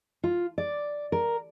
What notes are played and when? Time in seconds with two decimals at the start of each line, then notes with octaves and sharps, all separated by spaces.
0.24 F4
0.58 D5
1.12 A#4